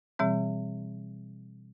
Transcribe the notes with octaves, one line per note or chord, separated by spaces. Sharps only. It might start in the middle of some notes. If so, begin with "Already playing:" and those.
B2 E3 G3 C4